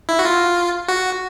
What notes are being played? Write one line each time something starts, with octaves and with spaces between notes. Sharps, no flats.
E4
F#4
F4
F#4